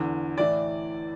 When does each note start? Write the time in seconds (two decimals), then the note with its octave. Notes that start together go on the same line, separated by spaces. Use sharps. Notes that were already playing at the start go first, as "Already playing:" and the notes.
Already playing: E2 D3
0.38 A2 E3 D5